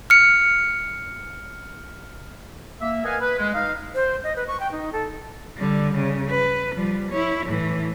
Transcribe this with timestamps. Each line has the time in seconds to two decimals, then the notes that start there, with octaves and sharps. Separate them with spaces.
0.10 F6 C#7
2.81 A#3 E5
3.05 A#4 B4 D#5 F5 F#5 G#5
3.21 B4
3.38 G#3
3.54 D#4 D#5 F5
3.95 C5
4.24 D#5
4.36 B4
4.48 C#6
4.60 G5
4.72 D#4
4.93 A4
5.57 D3 G3
5.95 C#3
6.29 B4
6.75 F3 G3
7.11 E4 C#5
7.46 A2 E3